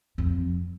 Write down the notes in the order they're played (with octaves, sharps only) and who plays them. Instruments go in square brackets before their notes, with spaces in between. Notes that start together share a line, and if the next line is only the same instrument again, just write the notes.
[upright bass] F2